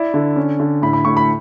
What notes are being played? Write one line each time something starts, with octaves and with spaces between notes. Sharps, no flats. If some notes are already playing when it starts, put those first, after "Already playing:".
Already playing: E4 D5
D3
C#4
D3
A2 B5
B5
A2 C#6
B5